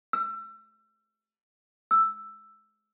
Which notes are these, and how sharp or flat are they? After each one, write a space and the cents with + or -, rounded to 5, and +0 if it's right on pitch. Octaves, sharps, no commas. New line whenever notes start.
E6 +30
E6 +5